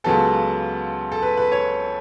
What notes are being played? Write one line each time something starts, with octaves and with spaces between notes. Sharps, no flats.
C#2 C#3 F#3 B3 A4
A4
B4
B4
C#5